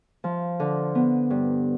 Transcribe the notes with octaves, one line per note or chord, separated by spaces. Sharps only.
F3
D3
B3
G2